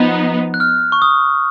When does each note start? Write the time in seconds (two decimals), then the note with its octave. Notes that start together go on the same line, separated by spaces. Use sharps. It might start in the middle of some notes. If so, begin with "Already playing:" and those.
Already playing: F3 B3 D#4
0.54 F#6
0.60 F6
0.92 C#6
1.02 D#6